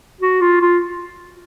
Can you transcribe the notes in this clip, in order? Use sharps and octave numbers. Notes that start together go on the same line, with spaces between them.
F#4
F4
F4